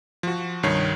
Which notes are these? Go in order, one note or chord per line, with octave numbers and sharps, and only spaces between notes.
F3 F#4
C2 G2 D#3 C#5 C7